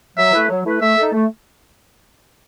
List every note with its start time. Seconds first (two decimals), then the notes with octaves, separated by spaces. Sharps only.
0.17 F#3 E5
0.33 A3 E4 B4
0.49 F#3
0.65 A3 E4 B4
0.81 A3 E5
0.97 D#4 A4
1.12 A3